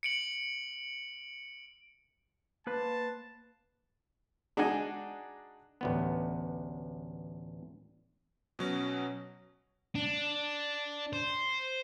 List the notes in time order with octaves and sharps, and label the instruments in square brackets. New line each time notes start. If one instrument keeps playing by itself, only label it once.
[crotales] C#7 D7 F#7
[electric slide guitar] A#3 B4 C5 [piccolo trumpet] A5
[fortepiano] D4 D#4 F#4 G#4 D#5 G#5
[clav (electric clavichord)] A1 D2 B3
[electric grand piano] B2 F#3 C#4
[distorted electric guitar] D4
C5